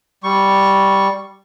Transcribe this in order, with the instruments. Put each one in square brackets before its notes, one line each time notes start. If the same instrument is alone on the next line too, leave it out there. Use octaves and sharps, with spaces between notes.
[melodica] G3 C#6